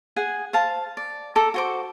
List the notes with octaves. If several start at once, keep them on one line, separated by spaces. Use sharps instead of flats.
G#4 F#5 G#5
C5 F5 A5
D5
A4 A#5 D6
F#4 C5 D6